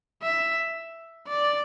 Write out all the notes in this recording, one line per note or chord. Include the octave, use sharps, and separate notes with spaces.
E5
D5